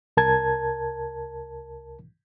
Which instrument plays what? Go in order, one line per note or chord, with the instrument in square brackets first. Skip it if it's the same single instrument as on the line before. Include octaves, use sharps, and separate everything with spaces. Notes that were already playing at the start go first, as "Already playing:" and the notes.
[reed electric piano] C2 A#4 A5 G#6